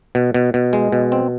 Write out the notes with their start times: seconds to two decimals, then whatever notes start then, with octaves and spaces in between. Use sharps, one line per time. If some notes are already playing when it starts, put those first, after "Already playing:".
0.15 B2
0.34 B2
0.54 B2
0.73 G#3
0.92 B2
1.12 C4